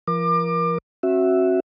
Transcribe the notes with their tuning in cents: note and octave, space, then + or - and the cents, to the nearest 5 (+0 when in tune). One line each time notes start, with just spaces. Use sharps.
F3 -35 A#4 +25 D6 +30
C#4 -45 F#4 +0 E5 +0